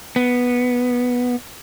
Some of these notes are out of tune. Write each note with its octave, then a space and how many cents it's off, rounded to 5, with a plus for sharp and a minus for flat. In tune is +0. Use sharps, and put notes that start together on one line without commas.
B3 -5